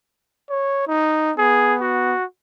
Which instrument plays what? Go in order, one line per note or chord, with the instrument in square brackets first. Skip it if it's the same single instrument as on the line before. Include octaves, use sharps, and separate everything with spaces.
[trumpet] C#5
D#4
[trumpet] B3 [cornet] G#4
[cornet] F#4